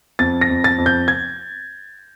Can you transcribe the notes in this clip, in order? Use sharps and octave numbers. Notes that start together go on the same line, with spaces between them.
F2 A6
A#6
F2
A6
F2
G6
G#6